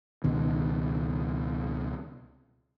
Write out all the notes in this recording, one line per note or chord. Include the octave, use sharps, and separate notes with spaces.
C#2 B2 D#3